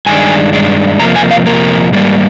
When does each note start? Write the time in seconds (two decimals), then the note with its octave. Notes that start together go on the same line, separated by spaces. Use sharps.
0.06 G2 D#3 G#3 D4 G#5
0.53 G2 D#3 G#3 D4
1.00 F2 C3 F3 A#3 A#5
1.16 G#5
1.31 F5
1.46 F2 C3 F3 A#3 A#4
1.93 G#2 G3 A#3